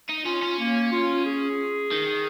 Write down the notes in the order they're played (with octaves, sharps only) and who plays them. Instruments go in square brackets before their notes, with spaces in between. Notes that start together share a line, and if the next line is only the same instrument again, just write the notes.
[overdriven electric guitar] D#4
[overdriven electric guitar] C#4 [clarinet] F4
[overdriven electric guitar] C#4
[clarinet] A#3
F4
G#4
[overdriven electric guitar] D#3